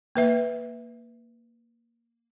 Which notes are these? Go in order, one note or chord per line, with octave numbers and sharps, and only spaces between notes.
A#3 B4 E5